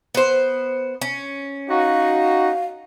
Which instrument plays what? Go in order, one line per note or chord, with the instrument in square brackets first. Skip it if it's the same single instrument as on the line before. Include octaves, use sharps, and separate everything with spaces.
[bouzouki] B3 C5
C#4
[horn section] D#4 F#4 [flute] F5